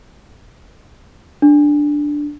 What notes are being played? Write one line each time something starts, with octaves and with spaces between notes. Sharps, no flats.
D4